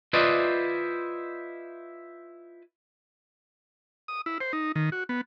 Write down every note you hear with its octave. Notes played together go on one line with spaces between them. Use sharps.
E4 F4 B4 C5 D5 D#5
D#6
E4
C5
D#4
D#3
F#4
B3